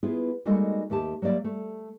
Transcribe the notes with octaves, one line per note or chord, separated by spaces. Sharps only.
B3 E4 F4 G#4 B4
G3 G#3 A#3 D#4 F#4 A4
D#2 A3 G4 A5
F#3 G3 A#3 D5 E5
A3